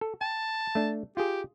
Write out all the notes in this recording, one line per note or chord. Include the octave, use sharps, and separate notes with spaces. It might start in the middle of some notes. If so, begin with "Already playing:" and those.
A4
G5 A5
A3 D4
F4 G4 G#4